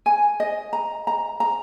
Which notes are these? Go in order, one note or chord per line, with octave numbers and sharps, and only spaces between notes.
G#5
D#5
A#5
A#5
A#5